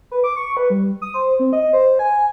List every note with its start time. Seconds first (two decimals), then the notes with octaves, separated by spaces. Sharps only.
0.11 B4
0.24 D6
0.36 C#6
0.57 B4
0.70 G3
1.02 D#6
1.14 C5
1.39 C4
1.53 D#5
1.73 C5
1.99 G#5